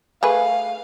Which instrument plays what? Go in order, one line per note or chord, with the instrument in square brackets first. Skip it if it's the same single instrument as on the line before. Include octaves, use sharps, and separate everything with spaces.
[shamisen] A3 G#4 B4 [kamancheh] F5